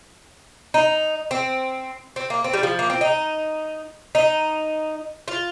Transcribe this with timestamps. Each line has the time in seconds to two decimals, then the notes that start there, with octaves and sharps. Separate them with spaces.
0.74 D#4
1.31 C4
2.16 C4
2.30 A#3
2.44 C4
2.53 G3
2.63 F3
2.79 A#3
2.90 C4
3.01 D#4
4.15 D#4
5.28 F4